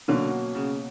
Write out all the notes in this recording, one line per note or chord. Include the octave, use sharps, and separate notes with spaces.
B2 D3 F#3 A#3 C#4
C#3